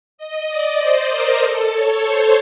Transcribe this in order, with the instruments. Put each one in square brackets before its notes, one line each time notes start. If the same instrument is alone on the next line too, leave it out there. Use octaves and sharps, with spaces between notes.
[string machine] D#5
D5
C5
A#4
A4
C#5
C5